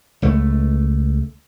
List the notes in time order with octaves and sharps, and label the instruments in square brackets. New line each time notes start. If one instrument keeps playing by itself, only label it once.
[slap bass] C#2 A3